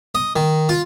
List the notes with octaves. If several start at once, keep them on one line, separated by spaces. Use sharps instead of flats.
D#5
D#3
F4